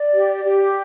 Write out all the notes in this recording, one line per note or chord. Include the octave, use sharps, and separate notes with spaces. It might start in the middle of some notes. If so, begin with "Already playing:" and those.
Already playing: D5
G4
G4